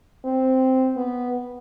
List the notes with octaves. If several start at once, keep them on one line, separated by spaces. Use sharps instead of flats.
C4
B3